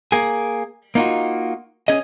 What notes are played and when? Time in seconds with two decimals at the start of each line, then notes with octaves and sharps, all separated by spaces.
0.12 A#3 G#4
0.95 A#3 D#4 F4 F#4
1.88 C#4 G#4 D#5